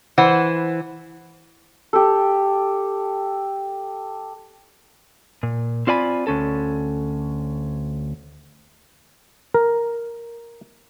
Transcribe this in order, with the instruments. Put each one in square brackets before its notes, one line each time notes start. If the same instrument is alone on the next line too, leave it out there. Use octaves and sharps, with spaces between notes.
[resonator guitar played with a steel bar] E3 C5 F#5
[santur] G4 A4
[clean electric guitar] A#2
C4 F4 D5 G#5 B5
D2 C#4 A4
[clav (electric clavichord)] A#4